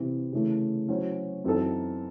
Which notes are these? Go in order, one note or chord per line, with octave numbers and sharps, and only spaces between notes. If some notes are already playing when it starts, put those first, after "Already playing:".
Already playing: C3 E3 C4
C#3 E3 A3
F#3 C#4 E4 C5
F#2 E3 C4 D#4 A4